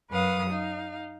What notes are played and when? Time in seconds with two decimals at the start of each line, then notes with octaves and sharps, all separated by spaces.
0.11 F#2 F#3 B4 F5 D#6
0.51 D#4 F5